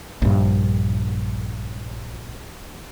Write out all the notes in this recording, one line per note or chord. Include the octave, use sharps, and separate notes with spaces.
A#1 G2